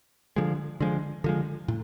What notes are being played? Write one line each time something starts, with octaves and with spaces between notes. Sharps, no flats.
D3 F3 G#3
D3 F3 G#3
D3 F3 G#3
A2